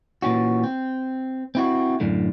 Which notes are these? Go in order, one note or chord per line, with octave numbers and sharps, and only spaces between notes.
A#2 E3 C#4 F#4
C4
C4 E4 F#4
F#2 A2 D3